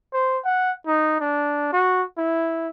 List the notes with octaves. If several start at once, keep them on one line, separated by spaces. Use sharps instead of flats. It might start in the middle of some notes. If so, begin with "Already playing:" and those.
C5
F#5
D#4
D4
F#4
E4